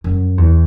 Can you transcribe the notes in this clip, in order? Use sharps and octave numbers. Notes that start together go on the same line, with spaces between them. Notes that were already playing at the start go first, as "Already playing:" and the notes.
F#2
E2